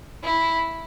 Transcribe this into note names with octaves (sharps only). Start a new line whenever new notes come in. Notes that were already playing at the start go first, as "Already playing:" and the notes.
E4